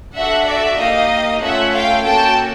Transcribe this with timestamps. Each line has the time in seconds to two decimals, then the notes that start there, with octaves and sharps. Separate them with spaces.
0.15 D4 F#4 A4 E5 F#5
0.47 D5 E5
0.79 A#3 D#4 G4 D#5 F5
1.41 A3 C#4 F4 A4 E5 F#5
1.73 F5 G5
2.05 A#3 C#4 F#4 A4 G5 A5